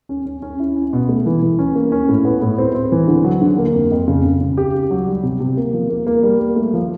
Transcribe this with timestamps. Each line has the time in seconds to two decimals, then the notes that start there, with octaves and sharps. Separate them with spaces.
0.09 C#4
0.26 C#4
0.42 C#4
0.60 E4
0.76 C#4
0.93 B2
1.09 A3
1.26 E3
1.42 E3
1.59 C#4
1.76 A#3
1.92 C#4
2.08 A2
2.25 B3
2.42 A2
2.58 C4
2.75 C4
2.92 E3
3.08 D3
3.24 F#3
3.42 D3
3.58 A#3
3.74 F2
3.91 F2
4.08 C#3
4.25 C#3
4.41 C#3
4.58 G4
4.74 G4
4.91 F#3
5.07 G3
5.23 C3
5.40 C3
5.57 A#3
5.73 F3
5.90 A#3
6.07 A#3
6.23 G3
6.39 A#3
6.56 A3
6.74 F3